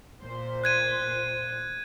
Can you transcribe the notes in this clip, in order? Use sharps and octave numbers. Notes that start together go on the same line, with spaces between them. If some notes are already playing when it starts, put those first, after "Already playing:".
A#2 C5
F#6 G#6 D#7